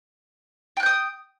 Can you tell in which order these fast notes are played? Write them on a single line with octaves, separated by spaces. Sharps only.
G5 F#6 G6 D#6